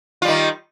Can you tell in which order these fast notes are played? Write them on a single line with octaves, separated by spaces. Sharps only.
F4 G3 D#3